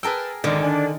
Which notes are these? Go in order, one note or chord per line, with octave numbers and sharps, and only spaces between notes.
G#4 A#4 B4 G5 A5 E6
G#1 C#2 D3 D#3 G#3 D4
D4 D5 G#5